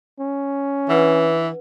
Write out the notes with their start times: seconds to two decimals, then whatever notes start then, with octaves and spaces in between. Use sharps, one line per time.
0.20 C#4
0.89 E3 D4 B4 F#5